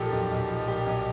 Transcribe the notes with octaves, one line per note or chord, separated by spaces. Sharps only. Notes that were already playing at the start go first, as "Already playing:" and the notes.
Already playing: B1 A#2 F3 G4 A4
B1
B1
F3
A#2 G4
B1